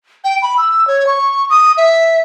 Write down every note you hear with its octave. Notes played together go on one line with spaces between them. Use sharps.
G5
B5
E6
C#5
C#6
D#6
E5